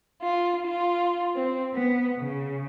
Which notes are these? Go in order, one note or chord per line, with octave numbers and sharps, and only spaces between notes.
F4
F4
C4
B3
C#3